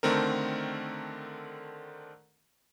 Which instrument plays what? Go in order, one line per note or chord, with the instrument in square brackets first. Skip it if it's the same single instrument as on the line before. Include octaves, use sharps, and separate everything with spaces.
[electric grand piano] D3 D#3 A3 C4 A#4